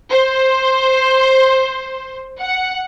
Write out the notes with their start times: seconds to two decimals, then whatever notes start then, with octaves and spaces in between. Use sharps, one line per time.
0.10 C5
2.41 F#5